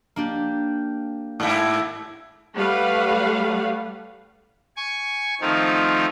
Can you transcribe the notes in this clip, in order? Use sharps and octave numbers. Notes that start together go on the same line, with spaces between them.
A#3 D4 G4
G#2 E4
G3 A3 B4 F5 F#5
G#5 C#6
D#3 F3 A3 C4 D#4 F4